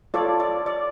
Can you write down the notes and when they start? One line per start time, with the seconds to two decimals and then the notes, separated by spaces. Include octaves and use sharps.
0.14 F4 A4 C#5 D5
0.40 D5
0.66 D5